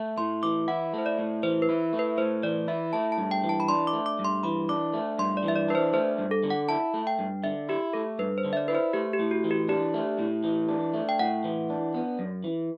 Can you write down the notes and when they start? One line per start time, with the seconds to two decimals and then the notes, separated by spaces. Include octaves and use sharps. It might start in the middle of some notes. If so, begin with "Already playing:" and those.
Already playing: A3
0.18 A2 C6
0.43 E3 D6
0.68 E4 F#5
0.94 A3 C5
1.06 D5
1.19 A2
1.43 E3 C5
1.62 B4
1.69 E4
1.93 A3
1.99 B4
2.18 A2 C5
2.43 E3 D5
2.68 E4 E5
2.93 A3 A5
3.12 A5
3.18 G2
3.31 G5
3.43 E3
3.49 A5
3.60 B5
3.68 D4 C6
3.87 D6
3.93 A3
4.06 D6
4.19 G2
4.24 C6
4.43 E3 B5
4.69 D4 D6
4.94 A3
5.19 G2 C6
5.37 D5
5.44 E3 E5
5.56 D5
5.68 D4 B4
5.75 C5
5.93 A3 C5
6.18 G2
6.31 A4
6.43 D3
6.50 F#5
6.68 E4 A5
6.94 A3
7.07 G5
7.19 G2
7.44 D3 E5
7.69 E4 G4
7.93 A3 A4
8.19 G2 B4
8.38 C5
8.45 D3
8.53 E5
8.57 D5
8.68 E4 B4
8.75 C5
8.93 A3 G4
9.13 G4
9.19 A2
9.31 F#4
9.44 E3
9.51 G4
9.68 D4 G4
9.94 A3
10.19 A2
10.44 E3
10.69 D4
10.94 A3
11.09 G5
11.19 A2 F#5
11.44 E3
11.70 D4
11.94 B3
12.19 F#2
12.44 E3